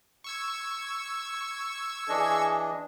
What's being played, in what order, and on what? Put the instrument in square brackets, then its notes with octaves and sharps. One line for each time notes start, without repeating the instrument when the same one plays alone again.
[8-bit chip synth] C#6 E6 G#6
[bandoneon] E3 D4 D#5 [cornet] G#4